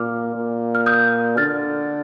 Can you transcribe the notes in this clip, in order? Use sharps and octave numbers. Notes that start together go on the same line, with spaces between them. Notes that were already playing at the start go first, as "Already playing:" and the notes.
Already playing: A#2 D6 F6
A#2
F6
D#6 G6
D3 F6 A6